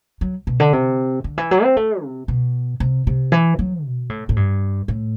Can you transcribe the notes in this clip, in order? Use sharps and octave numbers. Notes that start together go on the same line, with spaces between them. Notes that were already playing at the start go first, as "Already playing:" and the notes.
F#3
B2
D3
C3
D3
E3
F#3
C4
A3
C3
B2
C3
C3
E3
F#3
B2
A2
A2
G2
A2